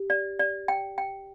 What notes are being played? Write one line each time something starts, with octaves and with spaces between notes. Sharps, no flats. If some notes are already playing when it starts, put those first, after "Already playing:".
Already playing: G4
D5
D5
G5
G5